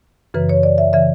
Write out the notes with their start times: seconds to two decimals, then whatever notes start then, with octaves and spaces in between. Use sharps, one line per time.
0.34 F#2 C#3 E3 B4
0.49 C#5
0.63 D5
0.78 E5
0.93 C#3 E3 E5